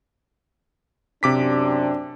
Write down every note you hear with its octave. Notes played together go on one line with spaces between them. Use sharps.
F#2 C3 C4 D4 D6 B6